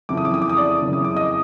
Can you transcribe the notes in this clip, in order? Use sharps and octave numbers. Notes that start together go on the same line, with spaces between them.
F#1 F2 C#3 E3 D6
D#6
D6
D#6
D6
D#6
D5 D6
F#1 F2 C#3 E3
D#6
D6
D#5 D#6